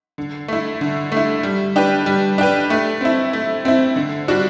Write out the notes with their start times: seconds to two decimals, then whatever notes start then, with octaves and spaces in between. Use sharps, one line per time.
0.18 D3
0.48 A3 E4
0.81 D3
1.12 A3
1.17 E4
1.43 G3
1.76 D4 G4 B4
2.06 G3
2.38 D4 G4 B4
2.70 A3
3.01 C4 E4
3.33 A3
3.65 C4 E4
3.96 D3
4.28 G3 D4 F#4